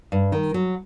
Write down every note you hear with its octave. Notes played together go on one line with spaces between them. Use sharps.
G2
D#3
F#3